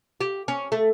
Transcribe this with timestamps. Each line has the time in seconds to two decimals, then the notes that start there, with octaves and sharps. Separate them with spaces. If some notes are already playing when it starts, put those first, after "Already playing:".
0.21 G4
0.48 C#4
0.72 A3